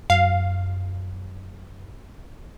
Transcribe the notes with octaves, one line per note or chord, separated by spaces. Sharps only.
F#2 F5